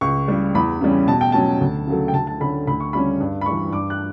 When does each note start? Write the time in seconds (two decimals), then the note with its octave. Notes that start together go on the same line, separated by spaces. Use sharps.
0.01 C#2 C#6
0.28 C#3 G3
0.55 E2 B5
0.81 C#3 E3 G3 C#4
1.07 B2 A5
1.21 G5
1.32 F#3 C#4 A5
1.61 D2
1.87 C#3 F#3 A3
2.08 G5
2.14 D2 A5
2.27 A5
2.40 D3 A3 C#4 B5
2.67 D2 B5
2.80 C#6
2.93 C#3 G3 C#4 B5
3.20 G2
3.41 B5
3.46 E3 G3 C#6
3.72 G2 D6
3.90 F#6